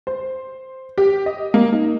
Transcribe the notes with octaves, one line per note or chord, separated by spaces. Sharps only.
C5
G4
D#5
A#3
D#4